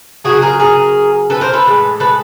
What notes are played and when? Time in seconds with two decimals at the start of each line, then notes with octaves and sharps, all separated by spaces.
0.24 C#3 F#3 A3 F#4 G#4
0.42 G#4 A#4
0.60 G#4 A#4
1.30 A4 B4
1.41 A#4 C5
1.53 A4 B4
1.65 A2 E3 G#3
2.00 A4 B4